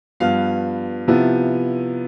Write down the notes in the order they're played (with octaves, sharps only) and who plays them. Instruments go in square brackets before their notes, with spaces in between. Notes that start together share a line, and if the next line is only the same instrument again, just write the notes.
[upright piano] G2 F3 B3 F5
C3 F3 B3 E4